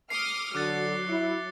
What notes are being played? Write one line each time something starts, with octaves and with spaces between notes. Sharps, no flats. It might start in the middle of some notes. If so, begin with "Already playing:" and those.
D6 D#6 F6 C7 C#7 G7
D3 F#3 D6 F#6 A6
E4